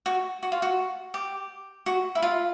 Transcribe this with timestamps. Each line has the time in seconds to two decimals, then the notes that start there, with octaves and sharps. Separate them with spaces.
0.06 F#4
0.43 F#4
0.52 F4
0.62 F#4
1.14 G4
1.86 F#4
2.15 E4
2.22 F4